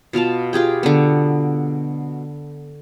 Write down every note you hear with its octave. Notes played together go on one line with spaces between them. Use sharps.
B2 F4 F5 A5
F4 G4 G#4 G5
D3 B3